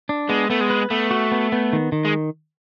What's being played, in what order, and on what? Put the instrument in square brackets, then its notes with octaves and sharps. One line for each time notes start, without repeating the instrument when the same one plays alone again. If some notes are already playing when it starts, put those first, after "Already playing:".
[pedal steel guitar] D4
[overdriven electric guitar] G#3 [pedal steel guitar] B3
[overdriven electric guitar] A3 [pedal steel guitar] B3
[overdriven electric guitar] G#3
[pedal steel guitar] B4
[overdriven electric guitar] A3 [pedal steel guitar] B3
[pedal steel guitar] F#4
B3
B3
D#3
D#3
[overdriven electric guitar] G#3